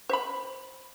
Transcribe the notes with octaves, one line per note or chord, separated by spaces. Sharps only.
C5 B5